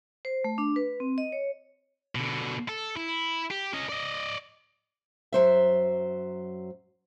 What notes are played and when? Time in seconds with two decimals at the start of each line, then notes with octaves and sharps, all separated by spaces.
0.25 C5
0.44 A3
0.58 D4
0.76 B4
1.00 C4
1.18 D#5
1.32 C#5
2.15 B2 D3
2.68 A4
2.97 E4
3.51 G4
3.73 C#4 D#5
3.89 D5 D#5
5.32 F#2 F#3 C5 E5